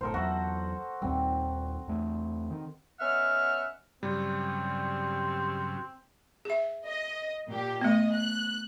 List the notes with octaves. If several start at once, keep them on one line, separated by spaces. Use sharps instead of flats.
F#1 A2 A4 A#4 C5
E2 F#3 F#4
D#2 A#2 G3 C4
E2 A3
D#3
B3 C#4 D#5 E5 F#5 F6
G2 C#3 F#3 G3 C4
G#4 E5
D#5
A#2 G4
A3 B3 D#5
F#6